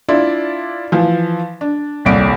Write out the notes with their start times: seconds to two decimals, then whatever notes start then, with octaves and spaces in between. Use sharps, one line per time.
0.08 D4 E4 F4 D5
0.92 E3 F3
1.61 D4
2.05 D#1 C2 D7